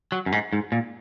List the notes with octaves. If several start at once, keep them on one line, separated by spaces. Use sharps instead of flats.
F#3
F#2
G#2
G#2
A#2